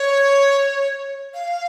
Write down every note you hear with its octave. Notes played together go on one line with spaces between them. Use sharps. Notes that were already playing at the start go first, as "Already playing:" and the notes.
Already playing: C#5
F5